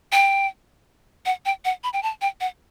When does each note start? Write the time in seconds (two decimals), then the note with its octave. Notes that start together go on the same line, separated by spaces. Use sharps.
0.12 G5
1.26 F#5
1.45 G5
1.65 F#5
1.84 B5
1.93 G5
2.03 A5
2.22 G5
2.41 F#5